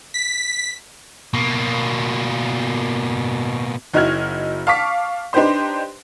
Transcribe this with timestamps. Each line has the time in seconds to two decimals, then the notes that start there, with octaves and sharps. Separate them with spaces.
0.14 B6
1.34 B2 A#3
3.93 F#1 D#4 E4 F#4 F6 G#6
4.67 F5 A5 C#6 D6 B6
5.33 D4 D#4 G4 B4 C5 C6